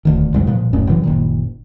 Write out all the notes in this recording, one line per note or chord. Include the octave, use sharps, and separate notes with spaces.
D#1 D2 D#3
B1 F2 G3 G#3
B1 A#2 F3
D#1 F#2 A2 C#4
F#1 C3 E3 F#3
F#1 A#2 D#3